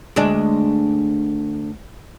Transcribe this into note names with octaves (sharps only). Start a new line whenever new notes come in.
D2 G#3 D4